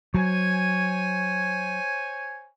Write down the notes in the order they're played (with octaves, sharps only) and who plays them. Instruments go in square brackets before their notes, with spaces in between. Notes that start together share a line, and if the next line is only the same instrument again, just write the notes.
[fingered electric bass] F#3 [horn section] C5 C#5 G#5